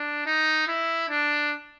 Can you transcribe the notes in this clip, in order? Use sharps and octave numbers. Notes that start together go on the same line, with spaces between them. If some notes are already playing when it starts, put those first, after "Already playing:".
Already playing: D4
D#4
E4
D4